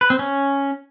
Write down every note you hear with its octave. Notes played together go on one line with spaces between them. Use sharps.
B4
C4
C#4